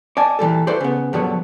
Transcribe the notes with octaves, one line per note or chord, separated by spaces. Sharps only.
D5 D#5 G#5 A5
A#2 E3 G3 A4
E4 F#4 A4 B4 C5 D5
C#3 B3
G2 B2 D3 F3 F#3 B3